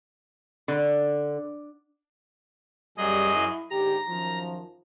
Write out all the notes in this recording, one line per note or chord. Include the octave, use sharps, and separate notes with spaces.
D3
F#2 G3 G#4 D#5
E4
G#2 D3 G4 A#5
F#2 D#3 F3